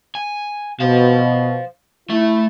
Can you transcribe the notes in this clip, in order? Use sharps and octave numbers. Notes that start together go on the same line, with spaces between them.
G#5
B2 C5 F5
A3 E4 E5